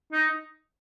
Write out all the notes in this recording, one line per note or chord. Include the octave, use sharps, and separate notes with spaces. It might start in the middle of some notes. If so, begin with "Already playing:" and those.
D#4